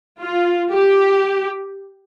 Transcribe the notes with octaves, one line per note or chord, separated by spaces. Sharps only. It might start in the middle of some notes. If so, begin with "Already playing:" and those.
F4
G4